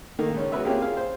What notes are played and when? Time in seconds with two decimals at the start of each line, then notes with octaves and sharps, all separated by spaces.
0.19 D#3 A3 A#3 D#4
0.34 C#2 C#4
0.52 G#3 B3 F#4 B4 C#5 E5
0.65 A#3 C4 C#4 F4 G4 G#4
0.82 G#4 F5
0.97 C5